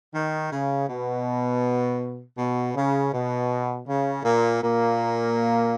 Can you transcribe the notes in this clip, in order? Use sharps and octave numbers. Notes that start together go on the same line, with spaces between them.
D#3
C#3
B2
B2
C#3
B2
C#3
A#2 A#3
A#2 A#3